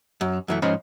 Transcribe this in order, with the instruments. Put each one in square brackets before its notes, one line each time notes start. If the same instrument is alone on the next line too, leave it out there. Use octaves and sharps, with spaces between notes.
[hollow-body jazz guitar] F#2
F#2 E3 A3
G#2 F3 C#4 C5 D#5 B5